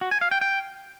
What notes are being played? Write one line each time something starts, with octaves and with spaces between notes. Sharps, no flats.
F#4
G#5
F5
G5
G5